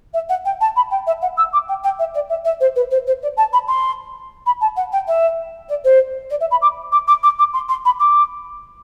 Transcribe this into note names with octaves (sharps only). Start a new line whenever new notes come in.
E5
F#5
G5
A5
B5
G5
E5
F#5
E6
D6
G5
G5
E5
D5
E5
E5
C5
B4
C5
C5
D5
A5
B5
C6
B5
A5
F#5
G5
E5
D5
C5
D5
E5
B5
D6
D6
D6
D6
D6
C6
C6
B5
D6